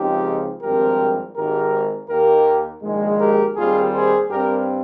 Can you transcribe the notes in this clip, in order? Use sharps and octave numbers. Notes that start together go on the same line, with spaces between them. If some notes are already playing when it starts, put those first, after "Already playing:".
Already playing: C#2 C#3 F3 C4 D#4 G4
G#1 G2 F3 C4 G4 A#4
G#1 G#2 D#3 G4 A#4
D#2 D#3 A#3 G4 A#4
A#1 G#2 D#3 G#3
G4 A#4
D#2 D#3 G3 C4 F4 G#4
G#4 C5
G2 G3 C4 G4 A#4